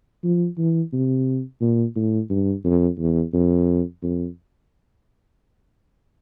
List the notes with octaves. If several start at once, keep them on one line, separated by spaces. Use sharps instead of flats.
F3
E3
C3
A#2
A2
G2
F2
E2
F2
F2